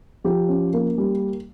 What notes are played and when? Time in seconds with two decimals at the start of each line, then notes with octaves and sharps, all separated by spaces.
0.24 F3 G4
0.49 C#4
0.74 A#3
0.98 G3